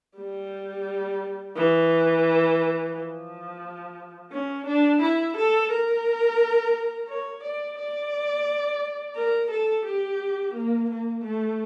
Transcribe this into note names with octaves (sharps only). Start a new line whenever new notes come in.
G3
E3
F3
C#4
D4
E4
A4
A#4
C#5
D5
D5
A#4
A4
G4
A#3
A#3
A3